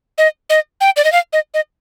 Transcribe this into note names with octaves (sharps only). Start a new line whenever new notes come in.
D#5
D#5
G5
D5
D#5
F5
D#5
D#5